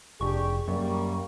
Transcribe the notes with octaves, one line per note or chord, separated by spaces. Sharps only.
F1 D4 G4 G#4 C#6
F#2 G3 A#3